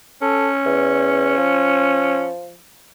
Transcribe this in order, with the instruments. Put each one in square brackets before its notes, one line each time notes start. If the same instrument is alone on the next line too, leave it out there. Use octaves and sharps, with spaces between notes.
[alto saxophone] C#4 [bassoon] A4
[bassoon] E2
F3